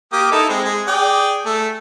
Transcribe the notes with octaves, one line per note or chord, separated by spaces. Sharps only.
A#3 G4 D#6
D#4 E4 A4
G#3 C4
G#3
G#4 D5 G5
A3